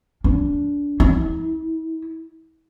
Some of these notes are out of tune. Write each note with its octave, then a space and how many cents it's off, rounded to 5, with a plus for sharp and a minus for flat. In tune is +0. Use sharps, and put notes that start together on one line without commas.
D4 -25
E4 -40